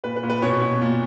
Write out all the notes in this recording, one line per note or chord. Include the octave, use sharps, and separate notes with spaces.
A#2 B4
B4
A#2
B4
B2 C#5
B2
A#2